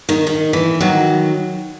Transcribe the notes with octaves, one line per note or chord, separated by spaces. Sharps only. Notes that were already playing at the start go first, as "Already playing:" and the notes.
D#3
D#3
E3
D#3 F#3